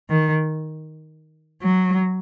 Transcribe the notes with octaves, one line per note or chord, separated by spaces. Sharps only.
D#3
F#3